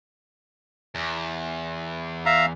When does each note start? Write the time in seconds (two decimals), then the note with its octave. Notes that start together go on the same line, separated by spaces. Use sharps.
0.95 E2
2.26 E5 F5 A#5